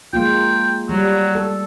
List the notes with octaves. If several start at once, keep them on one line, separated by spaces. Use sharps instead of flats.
G#3 A#3 F4 G5
F#3 G3
A4